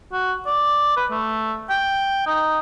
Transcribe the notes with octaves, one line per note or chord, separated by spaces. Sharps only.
F#4
D5
B4
A3
G5
D#4